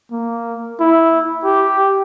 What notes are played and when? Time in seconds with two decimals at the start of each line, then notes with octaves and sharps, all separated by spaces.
0.12 A#3
0.80 E4
1.45 G4